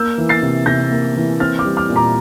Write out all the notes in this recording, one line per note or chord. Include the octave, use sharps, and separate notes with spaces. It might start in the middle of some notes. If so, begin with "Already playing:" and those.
Already playing: A#3 E6 G6
E3
A6 C7
C3
C3 G6 A#6
A#3
E3
C4 F6 A6
D6 F6
G3
D6 F6
A#2
A#5 D6